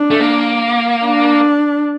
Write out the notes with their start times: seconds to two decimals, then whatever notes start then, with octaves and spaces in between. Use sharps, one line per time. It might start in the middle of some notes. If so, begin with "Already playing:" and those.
Already playing: D4
0.10 A3
0.20 A#3
1.06 D4